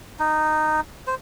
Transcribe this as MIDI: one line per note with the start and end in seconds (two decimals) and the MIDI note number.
0.19 0.80 63
1.07 1.15 72